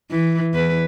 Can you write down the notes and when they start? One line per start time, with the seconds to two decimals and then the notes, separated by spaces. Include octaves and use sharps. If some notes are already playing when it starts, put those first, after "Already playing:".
0.11 E3
0.54 E2 B4